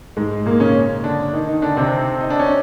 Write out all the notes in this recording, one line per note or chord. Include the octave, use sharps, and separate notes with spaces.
G#2 G#3
A#2 A#3
C#3 C#4
D3 D4
D#3 D#4
D#3 D#4
D3 D4
C3 C4
D#4
D4
C#4